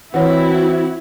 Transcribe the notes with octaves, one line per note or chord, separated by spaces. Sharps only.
E3 C4 E4 F#4 B4 C#5 F#5